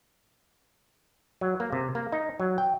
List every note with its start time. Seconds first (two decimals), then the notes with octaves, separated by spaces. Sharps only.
1.41 F#3
1.60 A#3
1.73 C3
1.95 A#3
2.12 D#4
2.40 F#3
2.58 G5